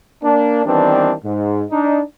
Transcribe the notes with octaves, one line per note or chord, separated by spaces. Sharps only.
A#3 D4
D#3 E3 G3 B3 C4 D4
G#2
D4 D#4